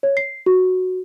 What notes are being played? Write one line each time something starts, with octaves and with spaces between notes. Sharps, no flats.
C#5
C7
F#4